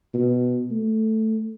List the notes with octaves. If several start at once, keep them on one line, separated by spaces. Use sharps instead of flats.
B2
A3